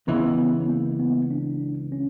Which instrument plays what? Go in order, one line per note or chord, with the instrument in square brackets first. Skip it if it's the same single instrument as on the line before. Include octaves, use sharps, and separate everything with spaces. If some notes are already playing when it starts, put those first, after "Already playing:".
[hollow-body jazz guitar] C#2 C#3 E3 [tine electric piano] B3
[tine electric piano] B3
B3
B3
A#3
B3
D4
C#4